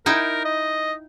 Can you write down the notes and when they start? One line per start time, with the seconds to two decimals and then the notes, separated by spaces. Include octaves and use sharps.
0.06 D#4 E4 A#4 G5
0.45 D#5